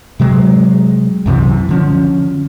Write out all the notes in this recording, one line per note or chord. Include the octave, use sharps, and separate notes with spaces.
C3 F#3 G#3
C2 F#2 C3 E3
D3 F3 C#4